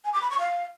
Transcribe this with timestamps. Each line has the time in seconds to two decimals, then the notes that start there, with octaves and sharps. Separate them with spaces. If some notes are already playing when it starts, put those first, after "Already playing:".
0.04 G#5
0.13 D6
0.22 B5
0.30 C#6
0.39 F5